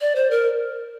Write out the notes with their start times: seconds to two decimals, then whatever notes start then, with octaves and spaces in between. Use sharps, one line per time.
0.01 D5
0.16 C5
0.31 A#4